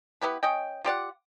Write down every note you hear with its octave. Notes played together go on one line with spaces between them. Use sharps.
B3 E4 G4 B4
C#4 D#5 G5
F4 G4 D5 F#5